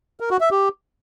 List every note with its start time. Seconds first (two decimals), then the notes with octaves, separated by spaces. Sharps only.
0.20 A#4
0.30 F#4
0.41 E5
0.51 G4